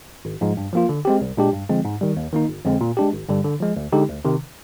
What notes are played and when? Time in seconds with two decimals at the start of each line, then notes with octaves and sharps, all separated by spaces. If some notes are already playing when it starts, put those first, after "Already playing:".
0.25 G#1
0.41 G#2 F3 G#3
0.57 G2
0.73 F3 A#3 F4
0.89 D3
1.05 G#3 C4 G4
1.21 C2
1.37 A#2 G#3 D4 G4
1.53 G2
1.69 D3 F3 G#3 C4
1.85 G#2
2.01 D#3 G3
2.16 D#2
2.33 D#3 A#3 D#4
2.49 G1
2.65 F2 D3 G#3 C4
2.81 A#2
2.97 G#3 D4 G4
3.13 G#1
3.29 G2 D3 G3
3.44 D3
3.60 F3 G#3
3.76 D2
3.92 D3 G#3 D#4 G4
4.09 D2
4.25 C3 D#3